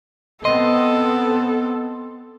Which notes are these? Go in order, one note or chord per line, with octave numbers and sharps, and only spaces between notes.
B3 C4 A4 D#5 C6